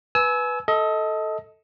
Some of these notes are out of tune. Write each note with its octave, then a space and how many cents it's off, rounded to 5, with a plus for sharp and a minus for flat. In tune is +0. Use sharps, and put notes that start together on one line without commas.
B4 +0 G#5 +30 E6 -15
A4 +0 D#5 +25